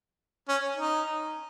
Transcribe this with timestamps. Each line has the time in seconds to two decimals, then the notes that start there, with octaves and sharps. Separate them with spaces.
0.49 C#4
0.76 D#4